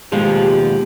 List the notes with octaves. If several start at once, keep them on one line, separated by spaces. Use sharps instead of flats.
D#2 B2 F3 G#3 G4